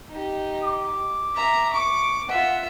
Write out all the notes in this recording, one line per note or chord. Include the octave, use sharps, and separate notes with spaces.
D#4 G4
D6
E5 A#5
C#6 D6
F4 E5 F#5